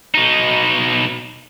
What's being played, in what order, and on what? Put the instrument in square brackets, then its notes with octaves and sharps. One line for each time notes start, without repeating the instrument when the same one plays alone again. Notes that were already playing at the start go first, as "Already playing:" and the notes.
[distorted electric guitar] B2 D#4